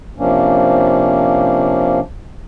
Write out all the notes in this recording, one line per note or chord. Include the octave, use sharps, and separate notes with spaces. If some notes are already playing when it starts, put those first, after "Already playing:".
C3 F3 A#3 C#4 D4